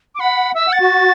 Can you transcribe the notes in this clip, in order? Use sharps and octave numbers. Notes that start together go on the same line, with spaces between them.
D6
F#5 B5
E5 E6
F#5
A6
F#4